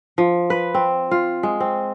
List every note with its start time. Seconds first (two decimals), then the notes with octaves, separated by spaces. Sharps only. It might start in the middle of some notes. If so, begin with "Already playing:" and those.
0.18 F3
0.50 B4
0.74 C4
1.11 F4
1.43 G#3
1.60 C4